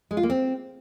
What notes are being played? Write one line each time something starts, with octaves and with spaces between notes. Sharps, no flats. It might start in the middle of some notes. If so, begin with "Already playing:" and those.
G#3
F4
A#3
C4